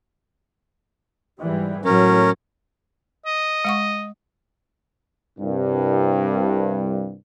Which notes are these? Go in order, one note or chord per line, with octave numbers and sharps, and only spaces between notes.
G#2 E3 G3
A2 F#3 C#4 A#4
D#5
G#3 F#5 C#6
C2 G2